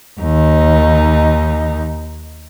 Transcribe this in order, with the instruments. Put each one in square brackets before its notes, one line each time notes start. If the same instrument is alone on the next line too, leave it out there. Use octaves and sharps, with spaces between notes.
[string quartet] D#2 D#4